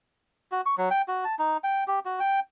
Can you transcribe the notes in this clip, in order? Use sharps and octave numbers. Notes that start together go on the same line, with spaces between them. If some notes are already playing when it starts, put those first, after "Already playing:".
F#4
C#6
F#3
G5
F#4
A5
D#4
G5
G4
F#4
G5